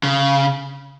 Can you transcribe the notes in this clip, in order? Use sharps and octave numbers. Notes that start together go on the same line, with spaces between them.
C#3